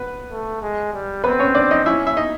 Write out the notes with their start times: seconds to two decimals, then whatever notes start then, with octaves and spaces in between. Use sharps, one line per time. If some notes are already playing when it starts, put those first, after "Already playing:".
Already playing: B3 B4
0.31 A3
0.62 G#3
0.93 G3
1.24 B3 C4 B4
1.39 C#4 C#5
1.55 D4 D5
1.71 D#4 D#5
1.85 C#4 E4 E5
2.07 E5
2.17 D#4 D#5